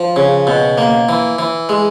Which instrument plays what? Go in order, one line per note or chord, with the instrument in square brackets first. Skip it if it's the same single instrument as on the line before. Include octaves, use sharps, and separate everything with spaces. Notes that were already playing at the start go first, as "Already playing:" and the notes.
Already playing: [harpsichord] F3
C#3
B2
A#3
E3
E3
G#3